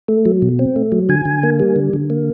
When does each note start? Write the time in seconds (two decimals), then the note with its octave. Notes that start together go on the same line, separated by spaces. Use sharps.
0.08 A3
0.25 F#3
0.42 B2
0.59 C4
0.76 A3
0.92 F#3
1.09 D3 G#5
1.25 D3
1.43 A#3
1.60 G3
1.76 D3
1.93 D3
2.10 A#3